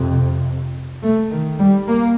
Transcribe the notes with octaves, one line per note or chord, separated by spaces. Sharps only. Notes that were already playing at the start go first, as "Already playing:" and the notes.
Already playing: F2 C3
A3
D#3
G3
A#3